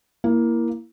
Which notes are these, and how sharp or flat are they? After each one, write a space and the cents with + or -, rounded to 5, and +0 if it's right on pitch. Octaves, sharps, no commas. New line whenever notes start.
A#3 +10 E4 +5